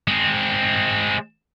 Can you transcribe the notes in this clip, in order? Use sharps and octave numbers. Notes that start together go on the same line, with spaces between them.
G#3 C4